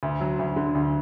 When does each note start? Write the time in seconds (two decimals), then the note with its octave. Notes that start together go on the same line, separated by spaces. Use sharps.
0.03 D2
0.21 F#3
0.39 D2
0.56 D3
0.75 D2